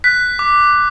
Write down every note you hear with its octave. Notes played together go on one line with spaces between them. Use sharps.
F#6 B6
D6